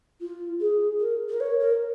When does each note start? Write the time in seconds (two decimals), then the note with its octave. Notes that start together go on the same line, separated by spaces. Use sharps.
0.21 F4
0.61 G#4
1.00 A#4
1.29 A#4
1.40 C#5
1.60 A#4